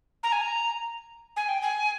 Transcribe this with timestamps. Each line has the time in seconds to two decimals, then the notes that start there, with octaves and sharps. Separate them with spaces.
0.23 A#5
0.32 G#5
0.42 A#5
1.36 G#5
1.49 G5
1.62 G#5